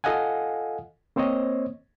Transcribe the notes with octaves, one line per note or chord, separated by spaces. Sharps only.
F4 A4 D#5 F5 F#5 G#5
A#3 C4 C5 C#5 D#5